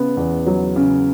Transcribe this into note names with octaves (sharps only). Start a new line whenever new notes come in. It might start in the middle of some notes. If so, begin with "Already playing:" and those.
Already playing: C#3 B3
E2
F#3
C#3